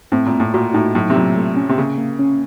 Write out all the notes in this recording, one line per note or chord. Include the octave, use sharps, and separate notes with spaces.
A2 C4
A#2
A3
A2
A#2 F#4
A2 D#4
A2 F#3
C3
A#2 F#3
A3
C#4
C3
C#3 A#3
A#3
C#4